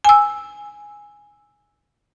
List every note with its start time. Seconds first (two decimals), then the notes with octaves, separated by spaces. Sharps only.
0.05 G#5 E6